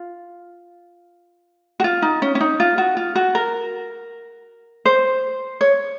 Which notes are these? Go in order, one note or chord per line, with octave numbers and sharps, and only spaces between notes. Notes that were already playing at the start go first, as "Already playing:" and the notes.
Already playing: F4
F#4
F4
D#4
C#4
C#4
D#4
F4
F#4
F4
F#4
A#4
C5
C#5